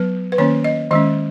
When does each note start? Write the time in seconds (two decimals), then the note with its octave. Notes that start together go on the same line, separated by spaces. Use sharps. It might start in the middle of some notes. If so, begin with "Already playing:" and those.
Already playing: F#3 B3 B4
0.32 B4
0.38 D#3 A#3 C#4 C#5
0.64 D#5
0.91 D#3 G#3 C#4 D#5